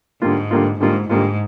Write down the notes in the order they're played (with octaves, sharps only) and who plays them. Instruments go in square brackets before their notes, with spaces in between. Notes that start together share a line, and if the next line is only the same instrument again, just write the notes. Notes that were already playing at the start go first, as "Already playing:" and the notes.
[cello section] G#2 [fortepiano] D3 G3 A#3 F4
[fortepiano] D3 G3 A#3 F4
[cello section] G#2 [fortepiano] D3 G3 A#3 F4
[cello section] G#2 [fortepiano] D3 G3 A#3 F4